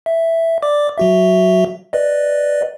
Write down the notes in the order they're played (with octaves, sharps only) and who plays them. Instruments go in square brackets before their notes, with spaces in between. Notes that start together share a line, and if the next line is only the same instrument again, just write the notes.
[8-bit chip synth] E5
D5 D6
F#3 F#4 E5
B4 D5 D#5